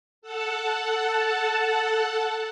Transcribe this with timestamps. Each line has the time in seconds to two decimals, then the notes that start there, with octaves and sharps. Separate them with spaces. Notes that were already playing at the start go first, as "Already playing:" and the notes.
0.22 A4 F#5 A5